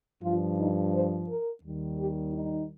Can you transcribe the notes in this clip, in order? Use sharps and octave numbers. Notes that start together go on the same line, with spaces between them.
G2 F3 F4
D#4
C5
A#4
D#2 D#3 G3
G4
D#4